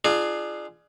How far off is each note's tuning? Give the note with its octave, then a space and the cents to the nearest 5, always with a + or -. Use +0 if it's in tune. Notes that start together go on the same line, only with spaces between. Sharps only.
D4 +30 F4 -15 G#4 +10